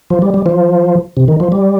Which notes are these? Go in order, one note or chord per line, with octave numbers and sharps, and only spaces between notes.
F3
G3
G3
F3
C3
D#3
F3
G3